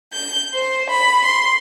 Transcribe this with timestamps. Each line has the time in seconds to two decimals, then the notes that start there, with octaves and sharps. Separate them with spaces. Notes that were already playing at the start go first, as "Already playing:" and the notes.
0.13 G6
0.54 C5
0.90 B5
1.24 C6